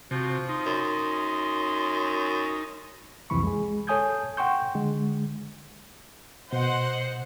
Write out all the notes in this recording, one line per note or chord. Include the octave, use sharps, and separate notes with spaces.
C3 F3 F#4
D#4 C6
F#2
C2 F2 C3 E3 B5 C#6
G#3 G#4
A4 C#5 G#5 D#6 G6 G#6
F#5 G5 C6 C#6 G6
D3 G#3
B2 C5 D#5 F#5